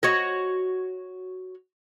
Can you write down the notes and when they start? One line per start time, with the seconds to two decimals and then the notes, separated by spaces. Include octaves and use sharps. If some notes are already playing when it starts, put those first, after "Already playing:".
0.03 F#4 C#5 D#5